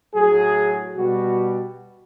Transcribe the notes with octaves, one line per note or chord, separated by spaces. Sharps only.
A2 F#3 G#4
B2 G3 F#4